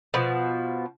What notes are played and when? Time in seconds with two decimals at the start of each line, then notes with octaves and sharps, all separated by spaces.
0.14 B2 F3